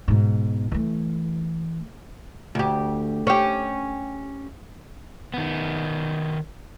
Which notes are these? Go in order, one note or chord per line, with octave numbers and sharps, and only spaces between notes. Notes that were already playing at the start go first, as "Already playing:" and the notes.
G#2 B2
E3 A3
D2 G4
C#4 G4
D#3 B3